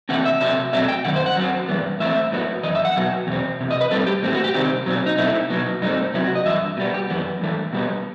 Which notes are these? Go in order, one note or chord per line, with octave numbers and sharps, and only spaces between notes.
C3 E3 A3 C4 F#5
E5
C3 F#3 A3 E5
B2 F#3 A3 C4 E5
G5
F#2 D#3 F#5
C5
F#5
F#2 F#3 C4
G2 E3 B3
A2 E3 A3 C4 E5
A2 F#3 B3
F#2 E3 D#5
E5
F#5
B2 F#3 B3
E2 B2 C4
E2 C3
D#5
B4
A2 G3 C4 A4
G4
A2 E3 A3 C4
F#4
G4
C3 D#3 G3 C4
B2 F#3 C4
D#4
B2 A3 C4 E4
B2 F#3 B3
G2 F#3 A3 C4 D#4
C3 F#3 B3 E4
F#4
D#5
G2 E3 E5
B2 G3 B3
G4
F#2 E3 B3
G2 E3 A3
B2 G3 B3